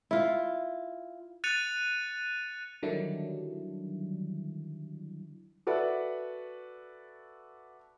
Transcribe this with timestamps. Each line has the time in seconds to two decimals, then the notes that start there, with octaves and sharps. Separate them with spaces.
0.11 E4 F4
1.44 F#6 A6 C#7 D#7 F7
2.83 D3 D#3 F#3 G3 D4 E4
5.67 F#4 A4 B4 D5 E5 F#5